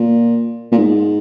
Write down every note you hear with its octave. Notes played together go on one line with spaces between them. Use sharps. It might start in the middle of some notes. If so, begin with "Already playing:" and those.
Already playing: A#2
A#2
G#2